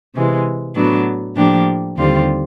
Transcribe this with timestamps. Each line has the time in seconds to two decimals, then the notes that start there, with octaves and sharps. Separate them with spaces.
0.15 C3 E3 G#3
0.75 A2 F#3 B3 D4
1.36 A2 F3 A#3 D4 G4
1.97 D#2 D3 G3 C4 F4